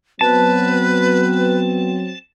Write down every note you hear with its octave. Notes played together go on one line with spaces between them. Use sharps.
F#3 B3 C4 B4 A5